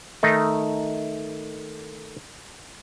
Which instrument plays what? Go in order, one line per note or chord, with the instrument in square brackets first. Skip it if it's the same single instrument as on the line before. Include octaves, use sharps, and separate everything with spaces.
[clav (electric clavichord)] D#3 A3 D#4